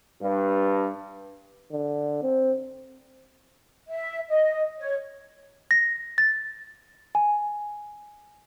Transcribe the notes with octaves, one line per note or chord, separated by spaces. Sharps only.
G2
D3
C4
E5
D#5
C#5
A#6
A6
G#5